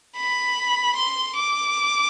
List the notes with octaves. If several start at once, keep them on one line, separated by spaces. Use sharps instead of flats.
B5
C6
D6